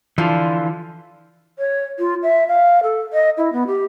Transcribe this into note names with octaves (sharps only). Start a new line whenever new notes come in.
D3 E3 F3 F4
C#5
F4
E5
F5
A4
D#5
E4
B3
G4